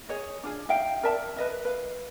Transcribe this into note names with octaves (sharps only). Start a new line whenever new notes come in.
G#4 C#5 D#5
D4 F4 G#4
D#4 E5 F5 G5
A#4 D5 E5 A5
B4 D#5 E5
B4 F5